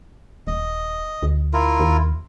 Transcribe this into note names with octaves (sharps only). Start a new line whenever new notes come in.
D#1 D#5
D2
E4 F4 A#4
D#2